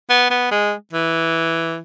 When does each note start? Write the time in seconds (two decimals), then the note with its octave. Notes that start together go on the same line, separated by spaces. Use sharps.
0.10 B3
0.31 B3
0.51 G#3
0.93 E3